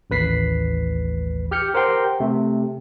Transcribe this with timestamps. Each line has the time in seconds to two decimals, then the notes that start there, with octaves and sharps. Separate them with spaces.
0.10 A1 D#2 B4 B6 C7
1.51 G4 F6 G6 C#7
1.74 G4 A#4 C5 F#5 G5 C6
2.20 C3 A3